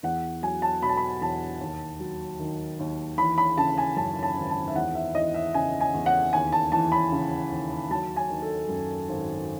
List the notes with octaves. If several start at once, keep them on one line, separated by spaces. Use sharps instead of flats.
E2 F#5
F#3 G#5
A5
B2 B5
A5
B5
E2 A5
D#2
F#3
D#3
D#2
E3 B5
B5
C#3 A5
G#5
F#2 A5
A5
G#1
A5
E5
E2 F#5
E5
E3 D#5
E5
C#3 G#5
G#5
E2
F#5
D#2 G#5
A5
E3 A5
B5
C#3
D#2
F#3 A5
G#5
D#3
A4
F#2
G#1